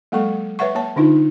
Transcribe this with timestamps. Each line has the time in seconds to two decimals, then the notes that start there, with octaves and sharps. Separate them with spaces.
0.12 F#3 G#3 A#3 A4 C#6
0.59 B4 C#5 E5 F#5 C#6
0.75 A#3 C#5 A5
0.96 D3 D4 D#4 F4